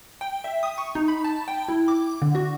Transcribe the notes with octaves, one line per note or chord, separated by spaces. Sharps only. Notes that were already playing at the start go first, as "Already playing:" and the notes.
G5
E5
D#6
C#6
D#4
B5
A5
G5
E4
D6
D3
F#4